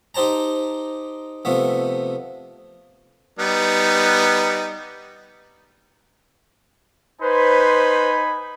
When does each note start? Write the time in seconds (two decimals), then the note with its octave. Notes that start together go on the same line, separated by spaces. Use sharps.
0.15 D#4 G4 C5 A5 A#5
1.45 C3 F3 A3 B3
3.39 G3 B3 D#4
7.22 D#4 B4 C5 G#5 B5